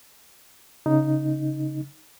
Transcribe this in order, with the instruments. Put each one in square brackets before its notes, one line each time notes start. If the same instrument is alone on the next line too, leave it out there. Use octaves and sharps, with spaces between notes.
[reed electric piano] C#3 D#4